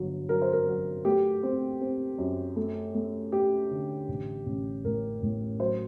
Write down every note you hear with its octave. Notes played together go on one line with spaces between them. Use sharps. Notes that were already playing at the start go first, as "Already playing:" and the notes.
Already playing: G1 F#3
F#3 A#4
C5
A#4
F#3
A3 G4
C4
C4
F#2
A3
A3
A3 G4
D3
A1
A1
A2 A#4
A2
F#3 C5